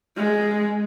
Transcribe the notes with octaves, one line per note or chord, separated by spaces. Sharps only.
G#3